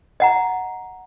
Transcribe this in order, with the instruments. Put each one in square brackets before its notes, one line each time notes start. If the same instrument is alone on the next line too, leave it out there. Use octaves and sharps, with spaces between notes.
[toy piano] D#5 F#5 A#5